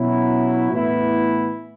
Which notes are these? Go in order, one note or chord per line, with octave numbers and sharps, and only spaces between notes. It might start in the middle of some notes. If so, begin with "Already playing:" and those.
Already playing: B2 F#3 C#4 E4
A2 E3 B3 E4